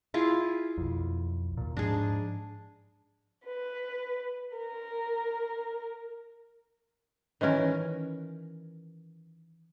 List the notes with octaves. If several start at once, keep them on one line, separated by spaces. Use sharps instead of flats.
E4 F4 G#4
B1 F2
D#2 A#2
G#2 F3 D4 G#4
B4
A#4
D#3 E3 C#4 A#4